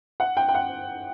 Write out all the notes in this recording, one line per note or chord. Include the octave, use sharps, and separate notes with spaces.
F#5
G5
G5
F#5